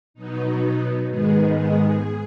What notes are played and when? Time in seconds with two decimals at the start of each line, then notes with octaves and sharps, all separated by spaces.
0.14 B2 F#3 B3 D#4
1.08 G#2 D#3 G#3 B3 G#4
1.54 G#4